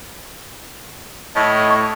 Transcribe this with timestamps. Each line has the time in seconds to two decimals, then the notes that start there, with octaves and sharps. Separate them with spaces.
1.36 A2 C#5 D#5
1.70 C#6